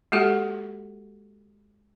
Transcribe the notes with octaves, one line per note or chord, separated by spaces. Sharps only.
G#3 A#3 F#4 G4 A4 F#5